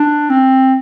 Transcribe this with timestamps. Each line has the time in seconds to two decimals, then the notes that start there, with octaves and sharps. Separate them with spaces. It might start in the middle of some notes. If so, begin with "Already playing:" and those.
Already playing: D4
0.29 C4